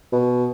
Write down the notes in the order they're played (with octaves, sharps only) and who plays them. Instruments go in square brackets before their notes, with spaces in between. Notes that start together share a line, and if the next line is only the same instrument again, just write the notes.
[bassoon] B2